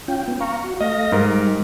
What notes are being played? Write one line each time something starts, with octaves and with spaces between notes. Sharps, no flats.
C#4 F4 G5
B3
F5 A#5 C#6
F#4
A3 D#5 F5 A#6
G#2 G3 A#4